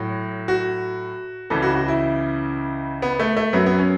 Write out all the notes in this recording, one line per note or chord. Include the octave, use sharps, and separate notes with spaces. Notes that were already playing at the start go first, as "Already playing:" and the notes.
Already playing: A2 F#3 F#4
F#4
C#2 C#3 E3 A4
F#4
F#4
E4
B3
A3
A3
F#2 F#3 B3
B3
C#4